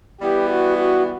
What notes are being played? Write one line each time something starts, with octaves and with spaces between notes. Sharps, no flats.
E3 G3 B3 G4
F#4
F#4